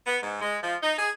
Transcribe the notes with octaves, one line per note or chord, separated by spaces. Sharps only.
B3
G#2
G#3
F3
D#4
G#4